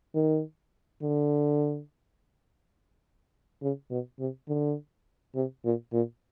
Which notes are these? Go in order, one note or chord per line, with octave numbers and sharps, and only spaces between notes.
D#3
D3
C#3
B2
C3
D3
C3
A#2
A#2